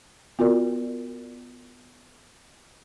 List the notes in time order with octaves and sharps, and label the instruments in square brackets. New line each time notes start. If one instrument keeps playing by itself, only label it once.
[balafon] B3 F4 F#4 A#4 D5